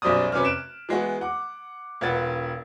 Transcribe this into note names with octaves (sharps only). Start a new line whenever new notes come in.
B1 F#2 G3 C5 D5 D#6
C3 C#4 B4 D6 F6
F#6 D7 E7
E3 G#3 B3 F#4
F#5 D6
E1 F4 B4 F#5 A6